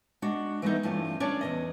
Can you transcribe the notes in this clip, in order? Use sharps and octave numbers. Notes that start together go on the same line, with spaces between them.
G#3 D4 F#4
E3 G#3 A3 B3 D#4
G2 E3 A3 C#4 F4
C#4 D4 A4 C#5 D5
E2 C3 D#5